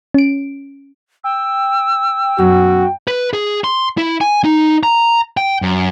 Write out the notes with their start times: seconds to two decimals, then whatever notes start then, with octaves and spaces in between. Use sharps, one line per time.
0.14 C#4 D7
1.24 G5 E6
2.38 F#2 B2 F#4
3.08 B4
3.33 G#4
3.64 C6
3.98 E4
4.21 G#5
4.44 D#4
4.83 A#5
5.37 G5
5.62 F#2